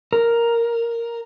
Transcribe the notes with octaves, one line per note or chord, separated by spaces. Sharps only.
A#4